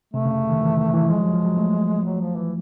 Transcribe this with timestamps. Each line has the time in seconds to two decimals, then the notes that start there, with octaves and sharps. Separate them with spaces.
0.14 C3 A3
0.25 C#3
0.50 D#3
0.61 E3
0.78 D#3
0.94 E3
1.09 F3 G#3
1.21 F#3
1.33 F3
1.45 F#3
1.57 A3
2.04 F#3
2.21 F3
2.36 E3